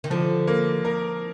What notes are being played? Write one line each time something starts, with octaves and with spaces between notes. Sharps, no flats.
D#3
D3 F3
A#3
A#4